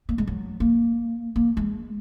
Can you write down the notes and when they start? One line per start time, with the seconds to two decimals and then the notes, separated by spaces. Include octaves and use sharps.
0.09 A#3
0.18 G#3
0.27 F#3
0.60 A#3
1.36 A#3
1.57 G#3